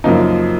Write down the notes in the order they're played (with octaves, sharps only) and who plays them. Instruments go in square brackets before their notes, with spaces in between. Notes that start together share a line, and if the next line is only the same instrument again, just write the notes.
[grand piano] F#2 C#3 F3 A#3 D#4